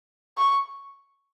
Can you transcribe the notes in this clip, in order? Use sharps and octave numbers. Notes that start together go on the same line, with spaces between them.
C#6